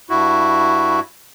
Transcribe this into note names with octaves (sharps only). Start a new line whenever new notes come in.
G2 E4 F#4